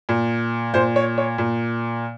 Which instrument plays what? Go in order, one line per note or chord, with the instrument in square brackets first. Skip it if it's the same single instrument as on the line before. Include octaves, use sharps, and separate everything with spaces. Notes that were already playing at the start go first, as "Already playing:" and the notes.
[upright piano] A#2
A#2 C5
C#5
C#5
A#2